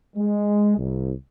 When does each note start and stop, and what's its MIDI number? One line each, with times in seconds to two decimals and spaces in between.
0.16 0.77 56
0.77 1.12 36